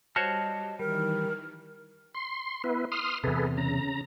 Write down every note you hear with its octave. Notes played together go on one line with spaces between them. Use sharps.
G3 F#4 C5 C#5 D#5 A5 F6
D#3 E3 G3 A#4
C6
B3 E4 B4
C6 D#6 F6
E2 C3 G#4 A4 B4
C#3 A#5